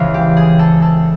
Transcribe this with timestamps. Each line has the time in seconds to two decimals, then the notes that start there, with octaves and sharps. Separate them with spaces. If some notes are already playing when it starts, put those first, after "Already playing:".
Already playing: C#2 C#3 E3 F4
0.14 G4
0.37 G#4
0.59 A4
0.82 A4